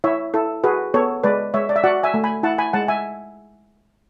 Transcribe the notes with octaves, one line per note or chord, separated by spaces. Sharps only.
E4 C#5 E5
E4 A4
F#4 G#4 B4
B3 A4 C#5
G#3 B4 D5
G#3 C#5 E5
D5
E5
F#4 D5 F#5
E5 G#5
A3
G#5 B5
E4 F#5 A5
G#5 B5
G#3 F#5 A5
E5 G#5